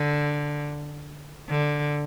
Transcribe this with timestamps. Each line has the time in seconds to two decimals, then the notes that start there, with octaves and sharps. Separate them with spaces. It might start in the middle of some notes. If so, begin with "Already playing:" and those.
Already playing: D3
1.50 D3